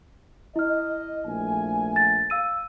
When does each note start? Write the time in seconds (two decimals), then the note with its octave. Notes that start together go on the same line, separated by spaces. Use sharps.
0.56 E4 D#5 F6
1.26 A#1 A3 G#5
1.96 A6
2.30 F5 E6 D#7